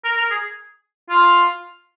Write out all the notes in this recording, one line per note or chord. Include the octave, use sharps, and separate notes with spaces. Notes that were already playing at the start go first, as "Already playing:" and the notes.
A#4
A#4
G#4
F4